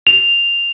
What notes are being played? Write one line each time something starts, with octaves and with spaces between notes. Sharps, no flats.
F7